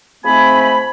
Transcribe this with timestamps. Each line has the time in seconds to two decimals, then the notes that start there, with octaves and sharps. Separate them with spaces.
0.24 G#2 F3 A3 C4 G#5 B5